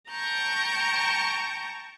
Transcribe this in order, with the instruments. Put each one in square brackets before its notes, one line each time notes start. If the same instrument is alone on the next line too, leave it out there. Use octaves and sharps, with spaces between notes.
[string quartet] G5 A5 A#5 C#6 G6